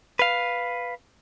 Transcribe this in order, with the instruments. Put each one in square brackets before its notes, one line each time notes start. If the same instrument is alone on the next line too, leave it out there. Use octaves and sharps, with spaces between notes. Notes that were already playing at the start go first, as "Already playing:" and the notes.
[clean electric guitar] B4 F5